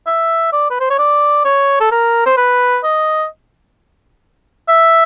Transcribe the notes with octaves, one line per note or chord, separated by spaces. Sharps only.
E5
D5
B4
C5
C#5
D5
C#5
A4
A#4
C5
B4
D#5
E5